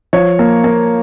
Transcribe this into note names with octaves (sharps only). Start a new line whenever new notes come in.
F3 C#5
A#3
A#3